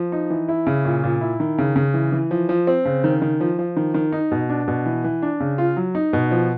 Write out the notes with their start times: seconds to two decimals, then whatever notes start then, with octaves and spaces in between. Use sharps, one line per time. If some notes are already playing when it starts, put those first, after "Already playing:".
Already playing: F3
0.12 D#4
0.30 E3
0.49 E4
0.67 C#3
0.85 A#2
1.04 A#2
1.21 E4
1.40 D#3
1.58 C#3
1.76 C#3
1.94 E3
2.12 E3
2.31 F3
2.49 F3
2.67 C4
2.85 C#3
3.04 D#3
3.22 D#3
3.40 F3
3.59 F3
3.76 D#3
3.94 D#3
4.12 D#4
4.32 B2
4.49 D4
4.68 B2
4.86 E3
5.04 E3
5.22 D4
5.40 C#3
5.58 F4
5.77 F#3
5.95 D#4
6.13 B2
6.31 F3